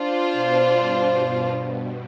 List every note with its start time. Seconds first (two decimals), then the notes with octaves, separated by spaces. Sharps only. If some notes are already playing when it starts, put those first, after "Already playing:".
Already playing: D4 F4 C5
0.32 B2
0.72 G2